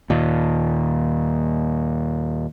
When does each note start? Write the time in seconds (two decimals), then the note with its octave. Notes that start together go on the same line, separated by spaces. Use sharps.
0.10 D#2 A#2